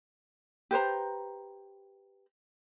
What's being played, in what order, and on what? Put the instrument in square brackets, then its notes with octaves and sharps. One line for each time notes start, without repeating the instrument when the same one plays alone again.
[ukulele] G4 B4 C5 A#5